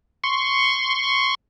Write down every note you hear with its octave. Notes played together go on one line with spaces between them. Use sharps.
C6 C#6